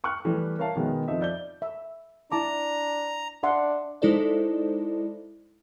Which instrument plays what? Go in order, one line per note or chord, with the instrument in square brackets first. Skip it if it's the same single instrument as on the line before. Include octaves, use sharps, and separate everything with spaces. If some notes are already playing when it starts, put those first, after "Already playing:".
[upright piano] G5 C#6 F6 F#6
E3 G3 A3 G4
A#4 C#5 E5 F5 A5
B2 D#3 G#3 B3
F2 F3 D#4 E5
D5 G6 G7
[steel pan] E5
[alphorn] D4 [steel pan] E4 A5 D6 [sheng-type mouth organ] A#5
[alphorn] D4 [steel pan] E5 F#5 C6
[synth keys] G#3 D#4 E4 A4 C5 D5